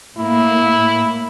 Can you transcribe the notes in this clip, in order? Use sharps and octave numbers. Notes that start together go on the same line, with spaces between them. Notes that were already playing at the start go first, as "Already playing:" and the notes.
A2 A#3 E4